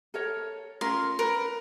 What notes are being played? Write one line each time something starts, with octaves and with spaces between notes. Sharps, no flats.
A4 A#4 C#5
C#4 F4 A#4 C6
A#4 B4